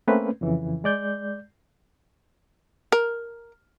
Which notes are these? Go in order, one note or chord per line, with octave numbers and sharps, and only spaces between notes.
A3 A#3 C4 C#4 B4
F2 C#3 E3
G#3 D5 G6
A#4